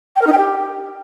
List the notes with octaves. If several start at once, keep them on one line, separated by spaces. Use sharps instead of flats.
G5
A#4
D#4
G5
G4